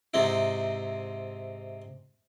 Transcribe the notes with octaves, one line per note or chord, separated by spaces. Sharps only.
G#2 C3 C4 D#4 E4